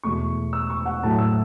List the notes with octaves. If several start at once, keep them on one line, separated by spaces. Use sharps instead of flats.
E2 B2 A3 C#6
E6
C#6
F#5
A2 F#3 A3 A5
E6